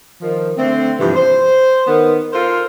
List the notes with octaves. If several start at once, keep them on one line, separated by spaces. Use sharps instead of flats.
D#3 F3
D3 A3 C4
G2 C3 E3 F3 B3
C5
D#3 B3
F4 A4 A#4 C5